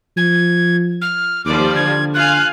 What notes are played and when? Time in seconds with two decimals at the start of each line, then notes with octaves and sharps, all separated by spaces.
0.17 F3 G#6
1.01 F6
1.45 D#2 F3 G3 D5 D6
1.76 D3 G#6
2.14 F4 F5 G#5 F#6